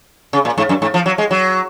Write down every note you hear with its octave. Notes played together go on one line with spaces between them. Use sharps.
C#3
A#2
G#2
F#2
G#2
F3
F#3
G#3
F#3